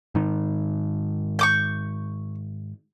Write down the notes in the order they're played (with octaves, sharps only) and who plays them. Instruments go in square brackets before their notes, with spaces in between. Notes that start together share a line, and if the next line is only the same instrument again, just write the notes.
[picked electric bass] G#2 D#3
[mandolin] C#6 D6 G6